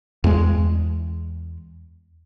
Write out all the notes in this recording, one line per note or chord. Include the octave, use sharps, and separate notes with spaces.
E2 G#3